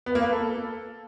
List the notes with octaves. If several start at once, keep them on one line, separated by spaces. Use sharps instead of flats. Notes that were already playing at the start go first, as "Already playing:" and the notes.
B3
A#3
B4
A4